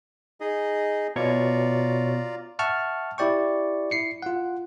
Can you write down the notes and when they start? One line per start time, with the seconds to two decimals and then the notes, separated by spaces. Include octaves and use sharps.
0.40 D#4 G#4 D#5
1.16 B2 F4 C#5 D5 A#5 C#6
2.59 E5 F#5 A5 C#6 F6
3.18 E4 G4 D5 G5 C#6
3.91 E4 C7 C#7
4.22 F4 F#5